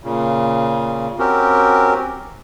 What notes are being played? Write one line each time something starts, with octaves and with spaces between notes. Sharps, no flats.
A#2 C#3
C4 C#4 F#4 G4 A#4